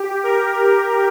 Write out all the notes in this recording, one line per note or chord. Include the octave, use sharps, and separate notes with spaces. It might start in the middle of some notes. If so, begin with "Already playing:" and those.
Already playing: G4
A#4